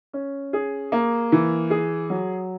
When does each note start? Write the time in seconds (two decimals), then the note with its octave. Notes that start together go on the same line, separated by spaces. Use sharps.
0.13 C#4
0.53 G#4
0.92 A#3
1.32 E3
1.70 G#4
2.10 F#3